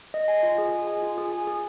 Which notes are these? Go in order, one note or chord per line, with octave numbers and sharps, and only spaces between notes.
D#5
G#5
F4
G#4
D#5
G#5
F4
G#4
G#5
G#4